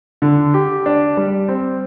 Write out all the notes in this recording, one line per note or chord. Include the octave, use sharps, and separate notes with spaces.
D3
G4
D4
G3
C4